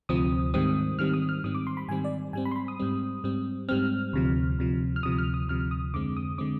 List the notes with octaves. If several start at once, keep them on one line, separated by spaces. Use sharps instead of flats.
D2 C3 F3 C4 D#6
G#2 D#3 G3 C4 D#6
G#2 D#3 G3 C4 F6
D#6
F6
G#2 D#3 G3 C4 D#6
D6
C6
B5
G#2 D#3 G3 C4 G#5
D5
G#2 G3 C4 G#5
B5
C6
B5
D#6
G#2 G3 C4
G#2 G3 C4
G#2 G3 C4 F6
D2 C3 F3
D2 C3 F3
F6
D2 C3 F3 D#6
F6
D#6
D2 C3 F3 F6
D#6
F2 D3 G#3 C4 D6
D#6
D3 G#3 C4 D6